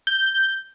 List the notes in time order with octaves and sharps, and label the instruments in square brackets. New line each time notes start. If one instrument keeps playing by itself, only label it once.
[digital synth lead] G6